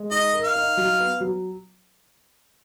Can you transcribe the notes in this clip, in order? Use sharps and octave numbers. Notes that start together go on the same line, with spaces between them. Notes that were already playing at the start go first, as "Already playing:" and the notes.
Already playing: G#3
D#4 D#5
A#4
F5
D#4
F#3
B3
F#3